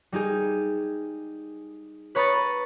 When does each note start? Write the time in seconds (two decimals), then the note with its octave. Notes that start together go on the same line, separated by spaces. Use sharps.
0.12 G3 D#4 G4 G#4
2.15 B4 C#5 A#5 B5 D#6 A6